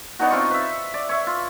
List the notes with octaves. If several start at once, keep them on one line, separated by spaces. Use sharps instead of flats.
B3 D4 D#4 F#4
C4 F4 C#6
B4 E5
D5
C#5 E5
F4